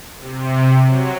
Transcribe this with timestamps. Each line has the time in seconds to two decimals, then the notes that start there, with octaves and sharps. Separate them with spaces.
0.20 C3
0.87 F#3